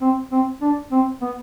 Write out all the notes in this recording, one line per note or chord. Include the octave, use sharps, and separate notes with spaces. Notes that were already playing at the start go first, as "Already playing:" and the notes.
C4
C4
D4
C4
B3